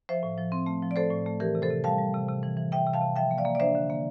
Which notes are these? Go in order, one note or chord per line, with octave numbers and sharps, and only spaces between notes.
F3 C5 E5
A2
F3
C4
A3
F3
D5
A3 A4 C5
A2
A3
E3 G4 A#4
C3
A4 C5
C3
G3 F5 A5
G3
C3
C3
E3
E3
C3 E5 G5
C3
F5 A5
C3
F3 E5 G5
A#3
D5 F5
A#3
D5
D4 C5 E5
D3
A#3